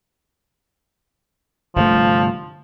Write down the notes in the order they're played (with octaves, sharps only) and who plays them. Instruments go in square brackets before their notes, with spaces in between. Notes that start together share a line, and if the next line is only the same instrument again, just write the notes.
[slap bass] G1 C3 A3 [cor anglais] F3